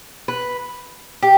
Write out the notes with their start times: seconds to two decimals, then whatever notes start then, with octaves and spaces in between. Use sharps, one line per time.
0.28 B4
1.22 G4